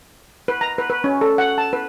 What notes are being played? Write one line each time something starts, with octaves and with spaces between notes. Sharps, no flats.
B4
A#5
B4
B4
C#4
A4
F#5
A5
B4